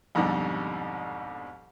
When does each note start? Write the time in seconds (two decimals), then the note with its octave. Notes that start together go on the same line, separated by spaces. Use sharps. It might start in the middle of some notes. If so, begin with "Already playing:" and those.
0.15 C2 F2 G#2 B2 D3 G3